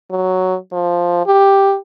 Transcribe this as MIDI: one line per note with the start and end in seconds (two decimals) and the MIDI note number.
0.11 0.56 54
0.72 1.26 53
1.26 1.76 67